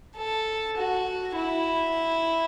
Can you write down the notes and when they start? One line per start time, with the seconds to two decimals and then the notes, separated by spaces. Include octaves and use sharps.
0.17 A4
0.77 F#4
1.35 E4